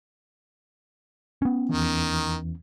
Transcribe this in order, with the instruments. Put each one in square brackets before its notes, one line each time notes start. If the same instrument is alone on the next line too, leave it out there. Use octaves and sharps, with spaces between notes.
[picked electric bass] B3 C#4
[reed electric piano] E2 E3 [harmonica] D#3